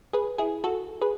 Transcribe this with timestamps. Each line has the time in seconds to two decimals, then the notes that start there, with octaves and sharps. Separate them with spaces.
0.13 G#4 B4
0.38 E4 G#4
0.64 F#4 A4
1.01 G#4 B4